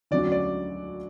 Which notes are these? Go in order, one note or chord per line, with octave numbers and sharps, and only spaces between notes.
D2 D3 F#3 C#4 F#4 D5
D5